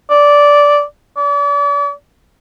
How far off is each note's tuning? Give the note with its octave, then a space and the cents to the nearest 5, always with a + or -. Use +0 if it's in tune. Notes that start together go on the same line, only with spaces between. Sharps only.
D5 -10
D5 -40